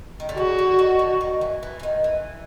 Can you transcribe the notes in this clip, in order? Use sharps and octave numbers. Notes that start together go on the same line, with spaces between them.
D#3
D3
C#3 F#4
D3
D#3
D3
D#3
E3
E3
E3
D#3
E3